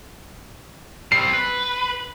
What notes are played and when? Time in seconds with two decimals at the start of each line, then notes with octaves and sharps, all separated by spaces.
1.12 G3 C4 C7
1.33 B4